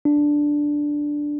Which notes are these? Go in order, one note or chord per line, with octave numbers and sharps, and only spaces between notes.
D4